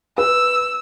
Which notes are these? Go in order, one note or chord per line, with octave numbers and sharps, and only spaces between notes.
B4 E6